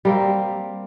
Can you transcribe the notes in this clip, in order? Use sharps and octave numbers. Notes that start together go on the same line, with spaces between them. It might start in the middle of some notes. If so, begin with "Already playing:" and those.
G3 A#3 C4